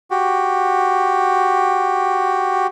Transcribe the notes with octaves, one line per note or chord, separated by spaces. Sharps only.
F#4 G4